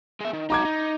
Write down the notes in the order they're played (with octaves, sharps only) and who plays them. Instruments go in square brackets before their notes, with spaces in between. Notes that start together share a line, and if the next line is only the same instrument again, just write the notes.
[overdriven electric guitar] G#3 E5
D#3
[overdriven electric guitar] D#4 F#4 [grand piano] A#5 D6 G#6
[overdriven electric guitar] D#4